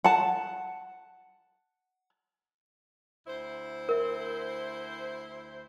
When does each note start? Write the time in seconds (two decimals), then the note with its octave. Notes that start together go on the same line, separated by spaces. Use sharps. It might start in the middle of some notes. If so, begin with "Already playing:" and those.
0.04 F#5 A5
3.27 D2 E4 C5
3.89 A#4 E5